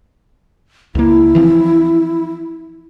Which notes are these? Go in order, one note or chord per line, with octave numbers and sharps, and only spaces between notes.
C#2 A#3 E4
E3 F3 C4